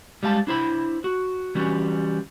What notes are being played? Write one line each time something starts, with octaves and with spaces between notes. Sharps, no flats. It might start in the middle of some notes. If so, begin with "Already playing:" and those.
G3 G#3 F5 A5
D4 E4 C5 B5
F#4
E3 G3 C#4 F#4